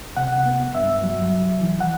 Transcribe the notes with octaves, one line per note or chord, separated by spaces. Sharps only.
C3 F#5
B3
G2 E5
F#3
C2
E3
F#5